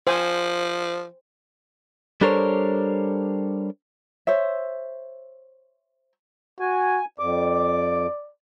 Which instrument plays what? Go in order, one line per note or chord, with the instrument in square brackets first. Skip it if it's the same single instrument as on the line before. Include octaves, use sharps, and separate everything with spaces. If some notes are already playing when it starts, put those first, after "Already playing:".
[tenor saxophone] F3 [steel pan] C5 G#5
[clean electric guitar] G3 D4 A4 A#4 C5 C#5
[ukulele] C5 C#5 E5
[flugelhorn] F#4 [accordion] G#5
[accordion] F2 D6 [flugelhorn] D5